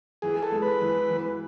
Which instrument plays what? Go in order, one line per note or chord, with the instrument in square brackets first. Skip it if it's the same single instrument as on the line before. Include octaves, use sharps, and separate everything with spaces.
[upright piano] E3 [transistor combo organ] G#4
[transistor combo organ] A4
[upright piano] G#3
[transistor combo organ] B4
[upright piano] E3
E3